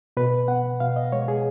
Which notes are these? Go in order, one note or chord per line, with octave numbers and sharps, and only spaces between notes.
B2 B4
B3 F#5
B2 F5
D#5
G#3 C#5
G#4